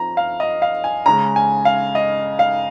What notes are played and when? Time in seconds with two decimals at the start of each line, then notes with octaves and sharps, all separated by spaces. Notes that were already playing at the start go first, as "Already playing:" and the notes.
Already playing: F3 C4 A#5
0.17 F5
0.40 D#5
0.62 F5
0.84 G#5
1.06 C#3 G#3 C#4 A#5
1.36 G#5
1.65 F5
1.95 D#5
2.39 F5